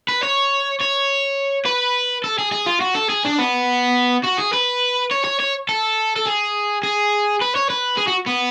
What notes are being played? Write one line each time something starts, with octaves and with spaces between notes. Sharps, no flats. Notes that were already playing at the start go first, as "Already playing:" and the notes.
B4
C#5
C#5
B4
A4
G#4
G#4
F4
F#4
A4
G#4
D4
B3
F#4
G#4
B4
C#5
C#5
C#5
A4
A4
G#4
G#4
B4
C#5
B4
G#4
F#4
B3